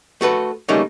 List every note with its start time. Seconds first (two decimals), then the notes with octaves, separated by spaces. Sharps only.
0.21 A3 F#4 A4 B4
0.69 C#3 G3 A3 A#3 C#4 D#4